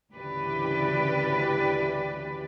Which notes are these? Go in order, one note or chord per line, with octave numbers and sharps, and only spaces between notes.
D2 C#3 E3 G4 B4 D5